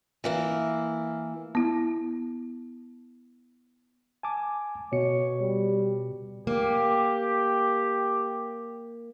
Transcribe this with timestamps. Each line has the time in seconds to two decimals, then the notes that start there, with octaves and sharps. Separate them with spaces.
0.24 E3 A#3 E4
1.55 B3 E4
4.23 G#5 A5 D6
4.92 B2 C#5 C#7
5.41 G3
6.47 A#3 G4